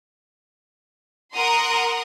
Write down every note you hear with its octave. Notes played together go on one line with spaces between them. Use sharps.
A#4 F#5 A#5 C6 D#6